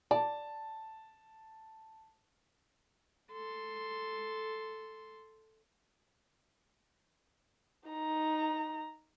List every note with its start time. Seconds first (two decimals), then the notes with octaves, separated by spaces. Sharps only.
0.11 D5 A5
3.33 A4 C6
7.89 D#4 A#5